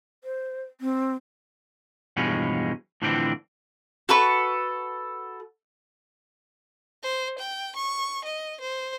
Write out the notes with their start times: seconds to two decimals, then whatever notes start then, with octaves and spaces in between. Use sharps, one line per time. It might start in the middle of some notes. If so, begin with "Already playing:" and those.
0.24 C5
0.81 C4
2.17 E2 G2 B2 F3 G#3 C#4
3.02 A2 D3 E3 F3 C4 D4
4.09 F#4 A4 B4 C#6
7.03 C5
7.38 G5
7.76 C#6
8.24 D#5
8.60 C5